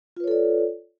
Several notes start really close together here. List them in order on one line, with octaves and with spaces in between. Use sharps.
F4 B4 C#5 A4 D5